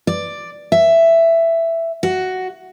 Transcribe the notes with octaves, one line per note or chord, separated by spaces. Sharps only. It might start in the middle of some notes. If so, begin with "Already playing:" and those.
D5
E5
F#4